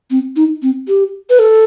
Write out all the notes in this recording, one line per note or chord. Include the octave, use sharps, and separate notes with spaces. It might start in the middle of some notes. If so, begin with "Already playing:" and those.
C4
D#4
C4
G4
B4
A4